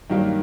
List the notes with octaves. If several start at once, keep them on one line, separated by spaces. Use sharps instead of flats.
G2 D#3 F#3 A#3